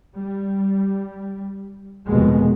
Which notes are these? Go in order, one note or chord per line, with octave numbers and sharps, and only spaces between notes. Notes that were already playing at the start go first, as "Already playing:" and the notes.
G3
F1 D#2 B2 G#3